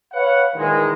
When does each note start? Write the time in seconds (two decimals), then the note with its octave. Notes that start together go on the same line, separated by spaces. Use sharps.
0.13 B4 C#5 F5 F#5
0.56 A#2 D#3 E3 G#3